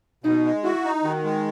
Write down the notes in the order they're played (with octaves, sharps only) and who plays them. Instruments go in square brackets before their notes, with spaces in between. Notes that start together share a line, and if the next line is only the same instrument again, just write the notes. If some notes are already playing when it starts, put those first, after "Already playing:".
[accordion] B2 [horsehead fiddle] D#4
[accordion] G#3
[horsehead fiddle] E4 [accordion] F#4
[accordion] D#4
[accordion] D#3 [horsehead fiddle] F#4
[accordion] G#3